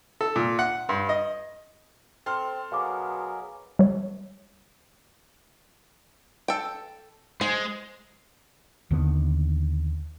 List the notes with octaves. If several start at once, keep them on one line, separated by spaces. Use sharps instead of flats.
A4
A#2
F#5
G2
D#5
C4 A4 C6 F6
B2 F#3 G#4 A#4 F5 D6
G3 C#5
A4 G5
G#3 C5
D#2 D3 D#3 B3